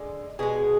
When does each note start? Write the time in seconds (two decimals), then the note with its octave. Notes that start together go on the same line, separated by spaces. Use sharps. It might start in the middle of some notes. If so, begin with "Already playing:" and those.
Already playing: D3 G#3
0.39 B2 G#3 G#4